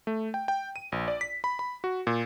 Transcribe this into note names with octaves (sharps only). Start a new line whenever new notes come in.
A3
G5
G5
D#7
A#1
D5
B6
B5
B5
F#4
A#2